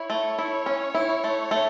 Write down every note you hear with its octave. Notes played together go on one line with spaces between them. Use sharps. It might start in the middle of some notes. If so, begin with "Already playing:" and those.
Already playing: E4 C#5
A3
E4
C#4
E4
A3
A3